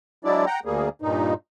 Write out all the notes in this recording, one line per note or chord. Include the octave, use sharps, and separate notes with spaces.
F#3 G#3 D4 E4 D5
F#5 G5 A#5
D2 G3 A#3 G#4
G2 A#2 D#4